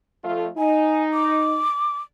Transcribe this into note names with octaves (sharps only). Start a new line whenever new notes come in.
F2 A3 F4
D#4 G#5
D6